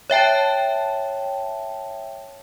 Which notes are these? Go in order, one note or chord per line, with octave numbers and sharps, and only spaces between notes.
C#5 E5 G5 A5